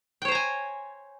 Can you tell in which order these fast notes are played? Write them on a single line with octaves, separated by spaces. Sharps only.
G5 C#5 C5 A#5 G#5